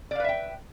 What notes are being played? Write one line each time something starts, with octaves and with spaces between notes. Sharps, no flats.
B4 D5 E5 F5 G5